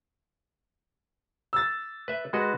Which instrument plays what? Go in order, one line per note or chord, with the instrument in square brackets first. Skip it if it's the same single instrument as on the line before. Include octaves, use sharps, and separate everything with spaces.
[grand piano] E6 A6
[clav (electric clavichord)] B4 E5
[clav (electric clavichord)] G#3 F#4 D#5 [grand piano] B4